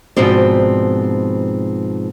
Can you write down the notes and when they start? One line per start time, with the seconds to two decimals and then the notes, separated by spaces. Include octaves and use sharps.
0.16 G#2 B2 F3 C4 D5